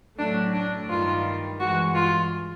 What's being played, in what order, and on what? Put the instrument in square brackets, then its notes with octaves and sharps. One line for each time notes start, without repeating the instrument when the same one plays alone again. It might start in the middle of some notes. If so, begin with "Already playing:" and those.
[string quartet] A2 F#3 A3 D4
D4
G2 D#3 G3 F4
G2 E3 G#3 F#4
F4